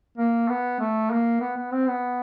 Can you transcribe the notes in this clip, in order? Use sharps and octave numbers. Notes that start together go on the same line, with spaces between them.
A#3
B3
A3
A#3
B3
B3
C4
B3